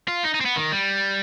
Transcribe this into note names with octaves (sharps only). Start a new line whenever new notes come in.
F4
D#4
D#4
C4
B3
D#3
G3